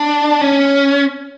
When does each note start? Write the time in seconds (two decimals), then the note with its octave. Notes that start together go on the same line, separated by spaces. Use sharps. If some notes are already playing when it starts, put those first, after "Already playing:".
Already playing: D4
0.41 C#4